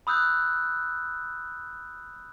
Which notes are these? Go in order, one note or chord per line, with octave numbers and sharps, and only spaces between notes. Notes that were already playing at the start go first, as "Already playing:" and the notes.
B5 D#6 E6 F#6 G6